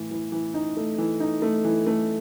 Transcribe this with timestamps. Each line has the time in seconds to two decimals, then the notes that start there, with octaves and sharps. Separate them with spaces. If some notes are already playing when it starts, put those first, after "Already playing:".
Already playing: A2 E3
0.11 E3
0.32 E3
0.54 D#4
0.77 A3
0.98 E3
1.20 D#4
1.42 A3
1.64 E3
1.87 A3